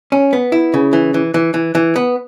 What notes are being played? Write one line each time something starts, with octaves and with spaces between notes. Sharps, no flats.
C#4
B3
E4
C#3
E3
E3
E3
E3
E3
B3